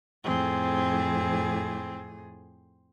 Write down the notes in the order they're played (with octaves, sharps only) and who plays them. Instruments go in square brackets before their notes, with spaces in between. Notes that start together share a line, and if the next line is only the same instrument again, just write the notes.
[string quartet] F2 A2 G#4 [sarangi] C4